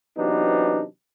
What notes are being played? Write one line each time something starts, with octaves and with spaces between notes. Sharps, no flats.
C3 E3 F#3 B3 D4 D#4